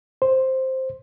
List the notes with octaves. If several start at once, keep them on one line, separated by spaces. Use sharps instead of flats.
C5